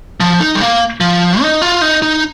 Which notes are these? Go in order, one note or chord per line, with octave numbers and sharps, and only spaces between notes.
F3
D#4
G3
A#3
F3
D#4
F4
D#4
D#4